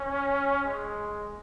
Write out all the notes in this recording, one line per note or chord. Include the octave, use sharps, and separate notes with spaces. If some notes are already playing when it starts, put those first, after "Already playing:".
Already playing: C#4
G#3